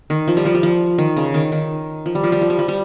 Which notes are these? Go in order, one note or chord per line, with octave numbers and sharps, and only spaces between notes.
D#3
F3
G3
F3
G3
F3
D#3
C#3
D#3
D#3
F3
G3
F3
G3
F3
G3
F3
G3